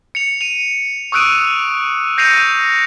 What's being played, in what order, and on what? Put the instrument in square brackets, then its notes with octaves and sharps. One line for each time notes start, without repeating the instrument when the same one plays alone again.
[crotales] C#7 F7
D#7 F7
C#6 D#6 E6 F#6 D7 D#7
G6 A#6 C7 C#7 D#7 F7